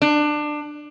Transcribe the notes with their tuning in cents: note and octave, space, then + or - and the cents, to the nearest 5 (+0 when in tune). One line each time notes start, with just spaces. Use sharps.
D4 +20